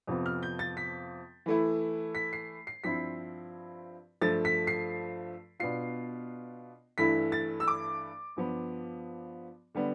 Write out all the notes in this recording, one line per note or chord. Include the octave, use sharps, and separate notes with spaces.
F2 C3 F3 B3 F4
F6
G6
A6
B6
E3 A3 E4
B6
C7
C7
G2 F3 C4 E4 B6
G2 F3 A3 A6
B6
C7
B2 B3 D4 F4 C7
G2 E3 A3 E4 B6
A6
E6
D6
G2 F3 B3
D3 G3 B3